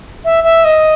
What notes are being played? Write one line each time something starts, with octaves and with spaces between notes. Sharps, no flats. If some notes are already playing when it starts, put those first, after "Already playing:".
E5
E5
D#5